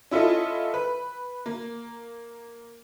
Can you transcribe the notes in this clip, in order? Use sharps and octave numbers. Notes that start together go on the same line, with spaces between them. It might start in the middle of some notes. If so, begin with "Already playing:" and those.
C#4 E4 F4 A4 D#5
B4
A#3